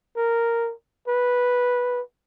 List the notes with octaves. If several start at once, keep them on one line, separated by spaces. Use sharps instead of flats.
A#4
B4